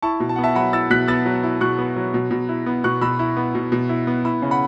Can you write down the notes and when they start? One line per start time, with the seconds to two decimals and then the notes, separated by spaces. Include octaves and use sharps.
0.02 E4 A5 C#6
0.20 B2
0.29 A5
0.36 F#5
0.38 B3
0.43 E5 A5
0.55 F#3 F#5 B5
0.73 E4 E6 A6
0.90 B2 F#6 B6
1.08 B3 E6 A6
1.26 F#3
1.43 E4
1.61 B2 C#6 F#6
1.78 B3
1.96 F#3
2.14 B2
2.31 B2
2.49 E4
2.66 B3
2.84 B2 C#6 F#6
3.01 B2 B5 E6
3.19 E4
3.37 B3
3.55 B2
3.72 B2
3.89 E4
4.07 B3
4.25 E4 B5 E6
4.42 C#3
4.51 F#5 B5